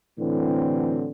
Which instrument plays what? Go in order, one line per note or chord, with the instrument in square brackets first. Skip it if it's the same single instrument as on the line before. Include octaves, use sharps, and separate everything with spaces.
[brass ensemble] A2 D3 E3 F#3 C4